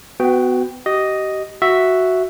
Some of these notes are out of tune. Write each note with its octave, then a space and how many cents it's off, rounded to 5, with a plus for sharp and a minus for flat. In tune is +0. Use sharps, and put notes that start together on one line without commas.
B3 +25 F#4 +0 G5 +0
G4 -35 D#5 +0
F#4 +0 E5 +0